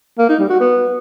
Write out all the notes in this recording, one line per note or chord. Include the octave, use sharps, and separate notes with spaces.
A#3
D#4
G3
F#4
B3